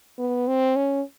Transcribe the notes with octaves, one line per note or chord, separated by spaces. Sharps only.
B3
C4
C#4